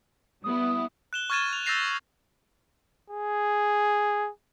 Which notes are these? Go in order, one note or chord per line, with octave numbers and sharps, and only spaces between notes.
G3 B3 E4 D#6
F#6 E7 G7
C#6 F6 G#6 A6 D#7 E7
F7
E6 G6 A6 A#6 C7 F7
G#4